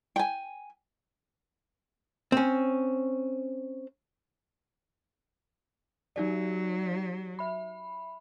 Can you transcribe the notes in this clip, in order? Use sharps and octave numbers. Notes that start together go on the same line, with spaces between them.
G5 G#5
C4 C#4
F#3 D#4 G4 D5
E5 B5